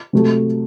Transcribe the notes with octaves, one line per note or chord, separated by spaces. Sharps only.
C3 F#3 A3